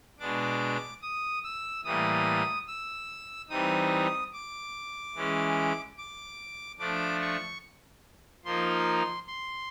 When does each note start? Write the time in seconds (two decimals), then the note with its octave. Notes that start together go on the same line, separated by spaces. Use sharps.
0.19 B2 G#3 B3 D4 D6
1.02 D#6
1.44 E6
1.84 A2 E3 G3 A#3 D#6
2.68 E6
3.49 E3 G3 C4 D#4 D#6
4.33 D6
5.15 E3 G#3 C#4
5.98 D6
6.79 F3 A3 D4 D6
7.21 C#6
8.45 F3 A#3 D#4 C6
9.27 C6